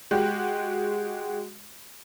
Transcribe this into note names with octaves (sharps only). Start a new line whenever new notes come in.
G#3 F#4 G4